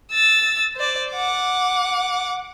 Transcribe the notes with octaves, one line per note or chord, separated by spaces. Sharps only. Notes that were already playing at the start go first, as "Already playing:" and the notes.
E6 A6
C5 D5
F#5 D6